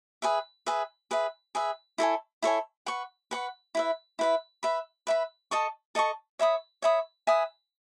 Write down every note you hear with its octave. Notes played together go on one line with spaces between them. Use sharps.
G#4 B4 E5
G#4 B4 E5
G#4 B4 E5
G#4 B4 E5
E4 A4 C#5 G#5
E4 A4 C#5 G#5
B4 F#5 C#6
B4 F#5 C#6
E4 B4 E5
E4 B4 E5
B4 E5 B5
B4 E5 B5
A4 D#5 A5 C#6
A4 D#5 A5 C#6
C#5 E5 B5 D#6
C#5 E5 B5 D#6
B4 E5 G#5 D#6